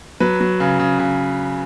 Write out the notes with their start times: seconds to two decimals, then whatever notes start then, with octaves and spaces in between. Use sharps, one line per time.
0.20 F#3 B4
0.41 F#3
0.60 C#3
0.79 C#3
0.99 C#3